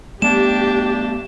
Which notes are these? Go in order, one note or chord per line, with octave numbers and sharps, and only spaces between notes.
A3 B3 D4 G4 E7